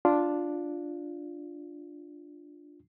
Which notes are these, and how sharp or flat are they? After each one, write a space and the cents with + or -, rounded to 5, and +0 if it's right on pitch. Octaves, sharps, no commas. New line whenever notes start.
D4 +0 F4 +0